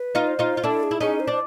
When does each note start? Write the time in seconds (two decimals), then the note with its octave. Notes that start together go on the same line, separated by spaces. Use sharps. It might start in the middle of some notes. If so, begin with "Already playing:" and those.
Already playing: B4
0.15 D#4 F4
0.27 C5
0.39 D#4 F4
0.57 F4
0.64 D4 E4 A4
0.83 G#4
0.91 E4
1.01 C#4 D#4 G#4
1.20 C5
1.27 D4